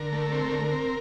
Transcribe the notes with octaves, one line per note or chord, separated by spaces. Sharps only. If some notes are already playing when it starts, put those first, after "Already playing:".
Already playing: D3 A#4
A3
C4
D3
C4